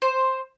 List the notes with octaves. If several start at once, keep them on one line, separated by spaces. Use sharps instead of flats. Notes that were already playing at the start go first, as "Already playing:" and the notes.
C5